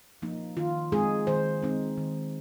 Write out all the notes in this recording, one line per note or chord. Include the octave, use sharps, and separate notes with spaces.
F3 A#3 D#4
D#3 F4
G#3 C4 D#4 G#4
D#3 C5
G#3 C4 D#4
D#3